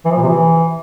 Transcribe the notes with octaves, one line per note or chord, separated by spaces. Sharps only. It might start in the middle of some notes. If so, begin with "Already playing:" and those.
E3
F3
A#2
C3
E3